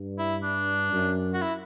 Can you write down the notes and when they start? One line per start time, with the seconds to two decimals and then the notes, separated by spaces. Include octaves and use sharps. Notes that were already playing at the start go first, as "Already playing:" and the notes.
Already playing: G2
0.19 E4
0.43 D4
0.92 F#2
1.34 F#4
1.42 E4